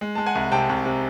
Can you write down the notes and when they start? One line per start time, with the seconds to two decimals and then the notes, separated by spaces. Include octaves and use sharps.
0.01 G#3
0.15 G#3 A5
0.26 F#5 G#5
0.35 C2
0.52 C3 G5 A5
0.69 C2
0.86 C3